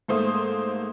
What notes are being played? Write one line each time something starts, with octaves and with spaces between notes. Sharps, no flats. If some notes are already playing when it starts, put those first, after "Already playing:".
G#2 A3 A#3 C5 C6 D#6